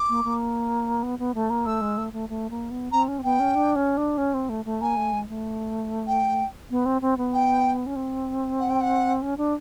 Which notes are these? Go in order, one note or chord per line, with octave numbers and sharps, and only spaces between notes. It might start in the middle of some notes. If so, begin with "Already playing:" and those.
Already playing: D6
A#3
A#3
B3
B3
A3
A#3
A3 E6
G#3
A3
A3
A3
A#3
B3
C4 A#5
C#4
C4
B3 G5
C#4
D4
C#4
D4
C#4
C4
A3
A3
A#3 G#5
A3
G#3
A3
G5
B3
C4
C4
B3
G5
C#4
C4
F#5
G5
F#5
C#4
D4